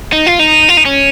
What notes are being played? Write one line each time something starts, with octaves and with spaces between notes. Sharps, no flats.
D#4
F4
D#4
F4
D#4
C#4